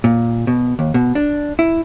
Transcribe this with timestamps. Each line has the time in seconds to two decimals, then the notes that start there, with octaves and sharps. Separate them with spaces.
0.04 A#2
0.47 B2
0.79 D#2
0.94 B2
1.15 D4
1.59 E4